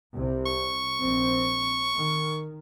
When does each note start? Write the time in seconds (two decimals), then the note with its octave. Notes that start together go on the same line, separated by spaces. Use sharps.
0.14 C2 C3
0.46 C#6
1.01 A#1 C4
1.95 D#3